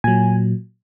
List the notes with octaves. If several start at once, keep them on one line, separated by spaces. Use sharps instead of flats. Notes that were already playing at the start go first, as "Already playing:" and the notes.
A#2 F#3 G#5